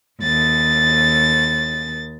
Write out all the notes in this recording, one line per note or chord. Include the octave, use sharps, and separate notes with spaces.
D#2 A6